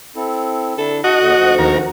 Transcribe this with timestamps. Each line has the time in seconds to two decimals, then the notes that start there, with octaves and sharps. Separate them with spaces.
0.16 C4 E4 A4
0.78 D3 D4 E4 A4
1.04 F#4 D#5 F#5 A5
1.20 D#2 D3
1.37 D2 F3
1.59 D#2 A#4